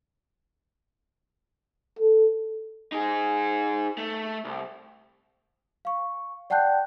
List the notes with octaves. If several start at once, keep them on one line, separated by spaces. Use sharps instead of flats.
A4
D#4 G#4
A3
C2
F5 C#6
D5 F#5 G5 A5 F#6 G6